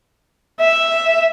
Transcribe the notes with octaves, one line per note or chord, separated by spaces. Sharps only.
E5